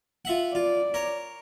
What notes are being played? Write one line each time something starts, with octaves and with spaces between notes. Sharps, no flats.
F4 E5 F#5
F4 D5
A#4 C#5